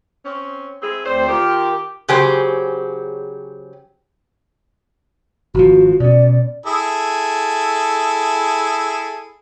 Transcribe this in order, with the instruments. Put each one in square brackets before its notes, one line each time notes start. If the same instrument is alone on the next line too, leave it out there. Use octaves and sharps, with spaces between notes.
[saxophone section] C4 C#4
C4 E4 G#4
[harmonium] D2 C4 D5 [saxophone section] C5
[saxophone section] D#3 G4 [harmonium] F4 A#4 G5
[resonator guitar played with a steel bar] C#3 F#3 G4 G#4 C5
[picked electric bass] G#1 F3 [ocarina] F#4
[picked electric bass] B2 C#4 [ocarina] D5
[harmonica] E4 G#4 A4